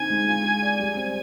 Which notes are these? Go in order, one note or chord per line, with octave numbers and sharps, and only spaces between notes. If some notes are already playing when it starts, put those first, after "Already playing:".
Already playing: D3 C4 D#4 G#5
G#3
F4
G#4
D5
G3
C4